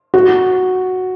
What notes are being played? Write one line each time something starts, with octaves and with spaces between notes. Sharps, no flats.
F#4